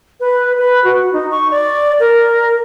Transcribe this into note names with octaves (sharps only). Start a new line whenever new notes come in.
B4
B4
F#4
D#4
C#6
D5
A#4